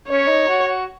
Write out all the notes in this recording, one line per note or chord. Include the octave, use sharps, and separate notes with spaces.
C#4 C#5
D#4
F#4
F#4